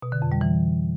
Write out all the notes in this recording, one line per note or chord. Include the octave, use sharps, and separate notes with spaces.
B2
D3
F2
G3
E3